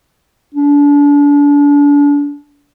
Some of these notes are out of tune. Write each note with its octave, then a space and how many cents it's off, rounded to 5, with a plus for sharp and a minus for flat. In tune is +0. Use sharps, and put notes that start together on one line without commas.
D4 -35